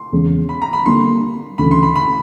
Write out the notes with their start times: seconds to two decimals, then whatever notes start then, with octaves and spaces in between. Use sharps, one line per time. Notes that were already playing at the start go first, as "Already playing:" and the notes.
Already playing: C6
0.12 E2 C#3 E3 G#3 C#4
0.49 B5
0.62 A#5
0.73 B5
0.86 D3 G3 A#3 D4 C6
1.58 D2 C#3 E3 B5
1.71 C6
1.83 B5
1.96 B5